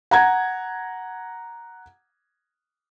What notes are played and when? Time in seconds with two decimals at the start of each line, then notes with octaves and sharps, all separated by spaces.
0.11 F#5 A#5 G#6